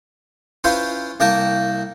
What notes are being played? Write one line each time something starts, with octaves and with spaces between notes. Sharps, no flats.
C#4 E4 F4 B4 C5
C2 A#3 A#4 G5 A5